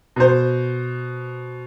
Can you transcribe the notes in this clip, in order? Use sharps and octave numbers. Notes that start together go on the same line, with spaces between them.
B2 C5